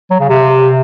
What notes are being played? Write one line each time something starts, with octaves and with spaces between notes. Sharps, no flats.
F#3
C#3
C3